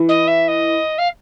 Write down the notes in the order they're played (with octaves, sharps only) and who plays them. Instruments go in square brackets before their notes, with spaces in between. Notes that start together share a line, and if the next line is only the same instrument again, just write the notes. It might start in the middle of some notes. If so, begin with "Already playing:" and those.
Already playing: [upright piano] E3
[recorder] D#5
E5
D#5
F5